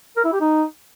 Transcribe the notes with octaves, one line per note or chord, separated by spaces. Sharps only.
A#4
E4
G4
D#4